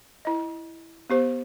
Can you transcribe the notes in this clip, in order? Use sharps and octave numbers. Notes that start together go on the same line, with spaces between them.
E4 D#5
B3 G4 C5